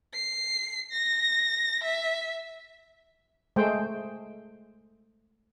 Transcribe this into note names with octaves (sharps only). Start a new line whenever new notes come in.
C7
A#6
E5
G#3 A3 C5 G5